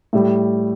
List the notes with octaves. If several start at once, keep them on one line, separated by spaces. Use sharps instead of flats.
A2 G3